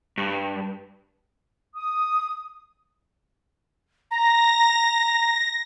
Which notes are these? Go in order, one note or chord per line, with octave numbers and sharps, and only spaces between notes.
G2
D#6
A#5 A#6